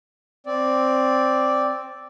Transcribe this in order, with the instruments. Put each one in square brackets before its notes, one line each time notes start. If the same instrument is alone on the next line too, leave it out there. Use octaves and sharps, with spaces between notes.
[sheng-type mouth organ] C4 [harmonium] D5